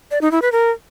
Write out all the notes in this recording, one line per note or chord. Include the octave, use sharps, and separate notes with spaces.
D5
D#4
E4
B4
A#4